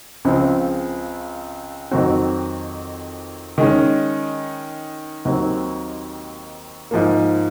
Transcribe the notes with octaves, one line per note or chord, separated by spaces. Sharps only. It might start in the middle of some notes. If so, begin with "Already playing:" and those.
C#2 C#3 F3 C4
F2 D#3 F#3 C4 F#4
D#3 G#3 C#4
D#2 D#3 F#3 C4
G#2 F3 A#3